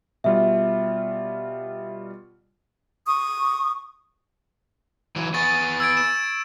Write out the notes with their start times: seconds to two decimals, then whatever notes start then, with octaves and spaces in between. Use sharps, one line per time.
0.24 B2 G3 F4 E5
3.06 C#6 D#6
5.16 E3 F#3
5.34 B3 G#4 C#6 A6
5.80 E6 G#6 D7
5.97 E7